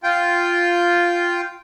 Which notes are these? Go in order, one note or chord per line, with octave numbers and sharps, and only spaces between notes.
F4 G5